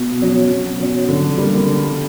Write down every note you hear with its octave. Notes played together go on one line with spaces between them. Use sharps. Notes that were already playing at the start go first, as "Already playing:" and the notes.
Already playing: B2
F#3 C#4
B2
F#3 C#4
D3
G3 A#3
D3